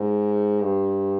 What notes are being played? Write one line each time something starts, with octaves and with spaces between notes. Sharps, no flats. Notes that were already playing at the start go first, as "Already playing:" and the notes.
Already playing: G#2
G2